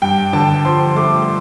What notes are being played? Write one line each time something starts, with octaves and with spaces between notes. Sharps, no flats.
G2 G5
D3 A5
F3 C6
A3 D6